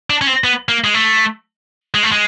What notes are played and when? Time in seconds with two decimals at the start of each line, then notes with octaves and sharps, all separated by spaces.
0.10 D4
0.21 C#4
0.27 C4
0.44 B3
0.69 A#3
0.84 G#3
0.94 A3
1.94 G#3
2.03 A3
2.12 G#3